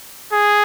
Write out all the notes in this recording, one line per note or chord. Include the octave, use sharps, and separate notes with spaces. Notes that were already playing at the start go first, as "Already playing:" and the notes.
G#4